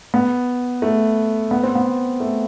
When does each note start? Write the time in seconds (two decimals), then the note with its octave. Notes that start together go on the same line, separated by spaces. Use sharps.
0.14 B3
0.82 A3
1.51 B3
1.63 C4
1.75 B3
2.20 A3